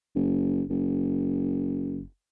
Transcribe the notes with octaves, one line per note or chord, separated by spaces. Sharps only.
F#1
F#1